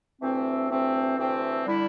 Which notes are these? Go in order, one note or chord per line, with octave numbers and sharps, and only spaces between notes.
D2 C3 E3 A3 C4
D2 C3 E3 A3 C4
D2 C3 E3 A3 C4
D3 G3 E4